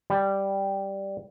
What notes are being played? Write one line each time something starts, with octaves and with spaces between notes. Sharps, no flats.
G3